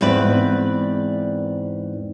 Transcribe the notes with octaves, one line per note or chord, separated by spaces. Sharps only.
E2 G#2 C4 B4 D5